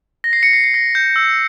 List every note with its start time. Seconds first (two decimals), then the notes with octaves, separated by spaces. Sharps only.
0.24 A#6
0.33 C7
0.43 C#7
0.53 C7
0.64 C7
0.74 A#6
0.95 G6
1.16 E6